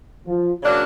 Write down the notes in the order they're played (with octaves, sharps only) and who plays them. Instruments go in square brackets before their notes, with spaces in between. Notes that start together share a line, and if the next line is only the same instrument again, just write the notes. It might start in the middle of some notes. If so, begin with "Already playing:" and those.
[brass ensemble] F3
[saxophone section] C#3 F#3 A#3 D4